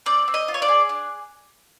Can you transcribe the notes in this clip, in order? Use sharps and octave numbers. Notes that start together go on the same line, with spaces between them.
C4 D5
C4
D#5
F4
C#5
D5
G#4
D4